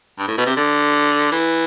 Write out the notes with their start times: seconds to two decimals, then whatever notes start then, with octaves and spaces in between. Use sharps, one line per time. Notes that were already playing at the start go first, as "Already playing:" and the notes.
0.19 G2
0.28 A2
0.38 B2
0.46 C3
0.56 D3
1.32 E3